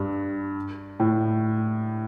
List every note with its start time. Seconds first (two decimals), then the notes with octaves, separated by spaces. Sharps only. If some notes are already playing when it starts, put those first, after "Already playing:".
Already playing: G2
1.00 A2